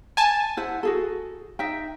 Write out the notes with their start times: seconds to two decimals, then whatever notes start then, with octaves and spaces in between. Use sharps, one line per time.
0.17 G#5 A5
0.57 E4 C5 F#5
0.83 F#4 G#4 A4
1.59 D#4 E5 G5